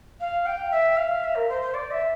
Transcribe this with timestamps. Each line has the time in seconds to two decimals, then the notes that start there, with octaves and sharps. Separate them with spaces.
0.20 F5
0.46 G5
0.71 E5
0.97 F5
1.24 E5
1.35 A#4
1.49 C5
1.62 C5
1.74 D5
1.91 E5